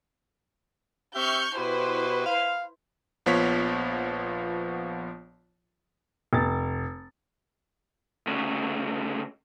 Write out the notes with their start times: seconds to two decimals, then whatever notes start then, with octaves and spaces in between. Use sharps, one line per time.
1.15 C4 G4 E5 C#6 F6 G6
1.56 B2 E4 F#4 G4 B4 C5
2.26 F5
3.26 A#1 F3 B3 F4 C#5 B6
6.33 F1 A6
8.27 D2 C#3